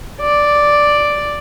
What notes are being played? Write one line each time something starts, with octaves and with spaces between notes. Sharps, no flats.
D5